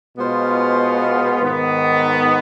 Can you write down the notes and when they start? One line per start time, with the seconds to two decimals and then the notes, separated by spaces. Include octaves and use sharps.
0.16 B2 G#3 B3 F4 C5
1.41 G#2 D#3 B3